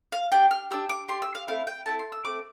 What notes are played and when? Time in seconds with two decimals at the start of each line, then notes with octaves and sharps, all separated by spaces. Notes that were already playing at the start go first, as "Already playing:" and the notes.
0.12 F5
0.32 D4 G4 G5
0.51 F6
0.71 D4 G4 E6
0.89 D6
1.08 D4 G4 C6
1.22 E6
1.35 F5
1.47 A3 C4 E4 F5
1.67 G5
1.86 A3 C4 E4 A5
1.99 C6
2.12 E6
2.25 A3 C4 D6